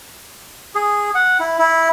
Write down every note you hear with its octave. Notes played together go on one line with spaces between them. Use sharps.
G#4
F#5
E4
E4